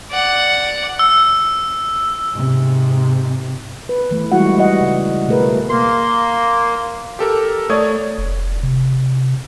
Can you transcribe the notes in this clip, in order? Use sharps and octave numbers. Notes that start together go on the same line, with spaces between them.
D5 F#5
E6
G#2 C3
B4
E3 A3
E3 G3 G#3 E4 F#4 F#5
G3 F#4 D#5 F#5
C#3
B2 A3 G#4 A#4 B4
A#3 C6
G4 A4 A#4
A3 C#5 D5 D#6 G#6
F1
C3